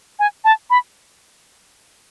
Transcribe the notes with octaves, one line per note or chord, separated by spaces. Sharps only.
G#5
A5
B5